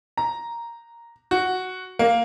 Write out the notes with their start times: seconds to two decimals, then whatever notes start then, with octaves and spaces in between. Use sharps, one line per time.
0.17 A#5
1.31 F#4
1.99 A#3